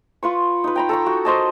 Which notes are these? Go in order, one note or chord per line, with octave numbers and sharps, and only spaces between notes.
F4 B4 C#6
D#4 B4
G5 A#5 B5
A4 A#5 C#6
F#4
A#4 C5 D#5 A5